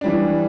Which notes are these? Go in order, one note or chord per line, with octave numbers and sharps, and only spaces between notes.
E3 G3 D4